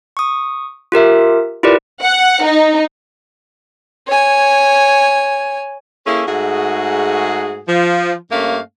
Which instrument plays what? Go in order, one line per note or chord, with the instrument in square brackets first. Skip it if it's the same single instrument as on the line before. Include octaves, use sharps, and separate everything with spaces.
[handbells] C#6 D#6
F4 G4 A#4 E5
E4 F4 G4 A#4 B4 D5
[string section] F#5
D#4
[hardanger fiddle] C#5 G#5
[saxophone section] A#3 C#4 E4 G#4 A4
G#2 A3 F#4 G#4
F3
G2 A3 A#3 C#4 F5